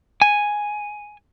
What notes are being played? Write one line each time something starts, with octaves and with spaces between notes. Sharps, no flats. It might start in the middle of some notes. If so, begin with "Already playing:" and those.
G#5